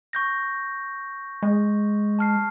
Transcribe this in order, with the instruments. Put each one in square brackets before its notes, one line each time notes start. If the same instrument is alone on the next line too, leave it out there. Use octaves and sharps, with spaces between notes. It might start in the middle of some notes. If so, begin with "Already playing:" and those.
[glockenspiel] C#6 G6 A#6
[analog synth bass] G#3
[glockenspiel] A5 F6 C7